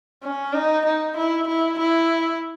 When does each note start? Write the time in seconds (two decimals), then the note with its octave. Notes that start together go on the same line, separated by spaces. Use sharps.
0.23 C#4
0.53 D#4
0.85 D#4
1.17 E4
1.48 E4
1.79 E4